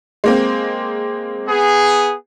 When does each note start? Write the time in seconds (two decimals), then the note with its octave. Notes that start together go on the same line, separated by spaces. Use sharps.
0.24 G#3 A#3 C4
1.47 B3 G#4